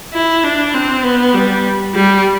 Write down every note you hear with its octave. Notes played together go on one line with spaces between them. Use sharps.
E4
D4
C4
B3
G3
G3